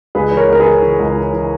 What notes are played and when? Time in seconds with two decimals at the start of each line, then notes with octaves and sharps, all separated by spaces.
0.15 C#2 G#4 B4
0.31 E3 B4
0.37 A#4 C#5
0.48 C#2 A#4
0.60 G#4 B4
0.65 E3
0.82 E3
0.99 C#2
1.16 E3
1.33 E3